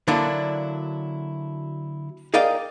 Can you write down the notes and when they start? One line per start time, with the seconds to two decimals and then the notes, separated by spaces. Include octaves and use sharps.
0.08 D3 F#3 A#3 D4 E4
2.34 G#4 A#4 D5 D#5 F5 G5